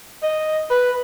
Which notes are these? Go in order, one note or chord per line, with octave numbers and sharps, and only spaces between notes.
D#5
B4